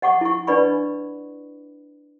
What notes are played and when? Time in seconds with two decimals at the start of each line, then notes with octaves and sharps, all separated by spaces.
0.02 D#5 F#5 C#6 D6
0.21 E4 C#6
0.47 D4 B4 D5 D#5 B5 C#6